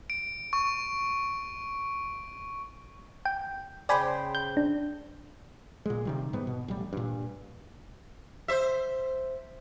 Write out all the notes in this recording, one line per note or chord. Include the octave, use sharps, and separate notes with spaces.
D7
C#6
G5
C#3 C5 D5 G5 G#5 B5
G6
D4
A#2 G#3
C3 D#3 G3
G#2 G3 B3
B2
A1 G3
G2 A#2
C5 E5